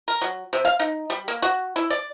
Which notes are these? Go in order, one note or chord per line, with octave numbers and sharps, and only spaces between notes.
A#4
F#3
C3
F5
D#4
G3
A#3
F#4
E4
D5